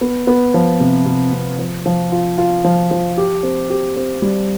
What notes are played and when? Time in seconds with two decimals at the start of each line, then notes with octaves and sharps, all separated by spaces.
0.01 B3
0.27 B3
0.54 F3
0.80 C3
1.06 C3
1.33 C3
1.59 F3
1.86 F3
2.12 F4
2.38 F4
2.64 F3
2.91 F3
3.17 G4
3.43 C4
3.70 G4
3.96 C4
4.22 G3